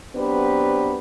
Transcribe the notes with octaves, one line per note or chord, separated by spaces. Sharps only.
F#3 B3 C4 D4 G4 B4